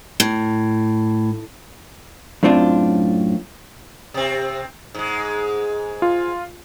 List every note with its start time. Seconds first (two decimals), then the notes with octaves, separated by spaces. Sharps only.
0.20 A2
2.43 F#2 A2 C4 D4 F4
4.14 C3 C4
4.94 G#2 G#3
6.02 F4